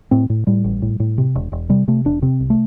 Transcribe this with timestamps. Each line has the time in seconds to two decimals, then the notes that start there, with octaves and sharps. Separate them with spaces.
0.11 A2 C4
0.30 A2
0.47 A2 G3
0.64 A1
0.82 A2
1.00 A2
1.18 C3
1.35 E1
1.52 E1
1.69 C3 G3
1.88 C3 A3
2.05 E1 D4
2.22 C3 C4
2.40 C2
2.50 A3